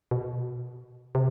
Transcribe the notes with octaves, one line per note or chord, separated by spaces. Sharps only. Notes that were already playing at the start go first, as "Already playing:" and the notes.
B2
C3